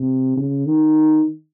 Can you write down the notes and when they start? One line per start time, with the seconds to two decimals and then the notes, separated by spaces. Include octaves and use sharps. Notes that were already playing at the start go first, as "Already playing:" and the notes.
Already playing: C3
0.37 C#3
0.66 D#3